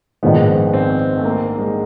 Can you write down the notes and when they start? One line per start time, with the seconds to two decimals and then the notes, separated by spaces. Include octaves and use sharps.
0.23 A#1 G#2 D#3 G#3 B3
0.74 C4
1.17 A3
1.24 A#3
1.58 G#3